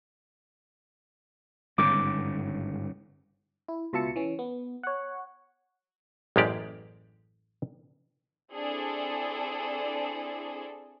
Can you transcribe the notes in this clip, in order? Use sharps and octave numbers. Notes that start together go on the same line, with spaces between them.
G1 G#2 C#3 D6
E4
C#2 B2 F4 E5 A5 C#7
E3 C#4
B3
C#5 F#5
A1 F#2 G#3 A#3 G4 D5
C4 D4 E4 G#4 A4 D5